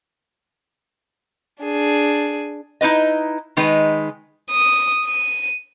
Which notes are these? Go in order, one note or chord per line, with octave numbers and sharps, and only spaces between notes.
D4 G#4
D#4 E4 B4 D#5
D#3 G#3 D#4 B4
D#6
D#7